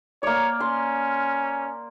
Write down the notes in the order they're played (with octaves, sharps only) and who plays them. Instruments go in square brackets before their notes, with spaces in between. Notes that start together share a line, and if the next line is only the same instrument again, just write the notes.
[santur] A#3 D5 [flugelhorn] C#5
[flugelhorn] C#4 [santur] C6